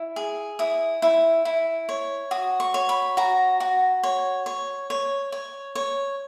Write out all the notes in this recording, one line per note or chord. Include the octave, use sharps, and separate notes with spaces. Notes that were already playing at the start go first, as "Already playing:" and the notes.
Already playing: E4
G#4
E4 D#6
E4
E4
C#5
F#4 D#6
C#6
C#5
B5
F#4 A#5
F#4
C#5
C#5
C#5
C#5
C#5